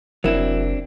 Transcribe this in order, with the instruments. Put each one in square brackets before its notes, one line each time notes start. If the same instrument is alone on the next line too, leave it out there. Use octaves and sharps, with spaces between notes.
[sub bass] F1 [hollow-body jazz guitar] F#3 E4 [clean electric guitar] C4 D4 [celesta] A#4